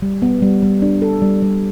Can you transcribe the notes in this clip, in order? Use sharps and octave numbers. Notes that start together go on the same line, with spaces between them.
G3
B3
G3
G3
D4
A4
G3
G3